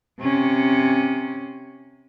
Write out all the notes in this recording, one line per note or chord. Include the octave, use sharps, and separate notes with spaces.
C3 C#4